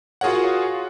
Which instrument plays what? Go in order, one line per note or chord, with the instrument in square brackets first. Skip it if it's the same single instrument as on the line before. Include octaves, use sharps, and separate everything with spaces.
[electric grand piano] F4 F#4 G#4 A#4 C#5 F#5